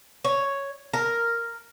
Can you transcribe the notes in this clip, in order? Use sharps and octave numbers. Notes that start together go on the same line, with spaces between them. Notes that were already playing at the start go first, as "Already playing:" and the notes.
C#5
A#4